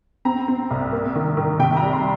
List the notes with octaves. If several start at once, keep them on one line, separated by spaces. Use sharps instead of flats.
C4 A#5
C4
C2
A#3
D#3
D#3
C3 G5
A#5
G3
C6